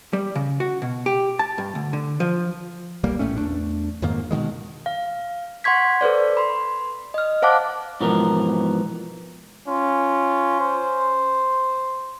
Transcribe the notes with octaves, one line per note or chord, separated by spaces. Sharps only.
G3
C#3
F#4
B2
G4
A5
G2
D2
D3
F3
D1 B1 G3 A#3
A#1 A2 A3 C#4
E2 G#2 A3 D4
F2 G#2 D#3 A#3
B2 D3 D#3 G#3
F5
F#5 C6 C#6 G#6 B6
A4 B4 C5 D5
B5 C6
D#5 F6
C5 F5 F#5 A5 D6 F#6
G#2 B2 E3 F3 B3 A#4
C#4 F4
C5